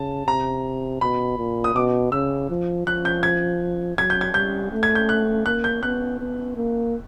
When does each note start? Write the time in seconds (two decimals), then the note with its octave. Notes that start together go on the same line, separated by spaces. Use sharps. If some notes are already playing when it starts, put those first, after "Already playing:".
Already playing: C#3 A5
0.27 C3 A#5
1.01 B2 B5
1.38 A#2
1.64 D#6
1.75 B2 D6
2.12 C#3 E6
2.50 F3
2.86 F3 F#6
3.05 G6
3.23 G#6
3.97 F#3 G#6
4.10 G6
4.21 G#6
4.34 G3 G6
4.71 A3
4.83 G#6
4.95 G6
5.09 F#6
5.46 A#3 F#6
5.64 G6
5.83 B3 F#6
6.19 B3
6.57 A#3